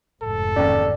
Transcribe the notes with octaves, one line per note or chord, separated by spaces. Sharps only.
F1 G#2 A4
A1 D#2 C#3 D5